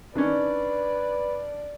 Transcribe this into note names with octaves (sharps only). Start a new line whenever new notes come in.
D#3 C#4 D4 B4 D5